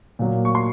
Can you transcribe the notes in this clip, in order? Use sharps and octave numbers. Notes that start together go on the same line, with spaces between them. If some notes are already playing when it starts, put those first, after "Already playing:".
A#2 F#3 A#3
C#6
C6